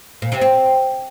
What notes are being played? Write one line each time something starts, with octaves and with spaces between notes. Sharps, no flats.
A#2
C3
C4